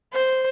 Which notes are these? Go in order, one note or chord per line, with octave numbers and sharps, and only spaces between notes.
C5